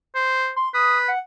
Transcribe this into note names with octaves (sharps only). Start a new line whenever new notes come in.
C5
C6
B4 D#6
F#5